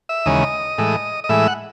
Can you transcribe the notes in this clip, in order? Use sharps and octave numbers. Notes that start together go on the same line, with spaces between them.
E5
D#2 C#3 E3 G#3 D#5
A2 E3 G#3
D#5
A2 E3 G#3 E5
F#5